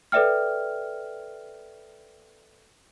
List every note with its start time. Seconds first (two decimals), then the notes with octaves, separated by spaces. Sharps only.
0.12 A4 B4 D5 E5 G5 F6